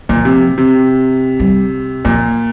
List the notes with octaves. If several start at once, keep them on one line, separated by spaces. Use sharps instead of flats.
A#2 F3
C3
C3
G3
A#2 F3